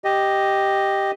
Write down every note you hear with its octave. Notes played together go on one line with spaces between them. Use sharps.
G4 D#5